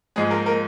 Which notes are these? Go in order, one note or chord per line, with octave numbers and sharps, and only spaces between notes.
G#2 F3 G#3 G#4
A#3 A#4
A#3 A#4